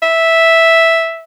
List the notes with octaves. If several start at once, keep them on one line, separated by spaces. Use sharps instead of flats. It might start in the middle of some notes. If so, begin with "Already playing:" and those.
E5